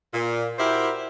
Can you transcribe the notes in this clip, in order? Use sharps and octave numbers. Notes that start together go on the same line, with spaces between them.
A#2
E4 F#4 G4 A#4 C5